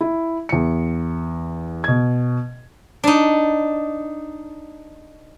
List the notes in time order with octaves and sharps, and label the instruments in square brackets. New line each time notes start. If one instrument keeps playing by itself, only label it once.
[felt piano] E4
E2 C#7
B2 G#6
[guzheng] D4 D#4